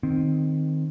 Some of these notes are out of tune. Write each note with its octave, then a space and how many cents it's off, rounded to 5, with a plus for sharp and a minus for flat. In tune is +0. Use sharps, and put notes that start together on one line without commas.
D#3 -10 C4 +0